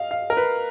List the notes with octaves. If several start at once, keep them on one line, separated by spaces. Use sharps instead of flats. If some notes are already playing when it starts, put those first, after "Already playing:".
Already playing: D#5 F5
F5
A#4
B4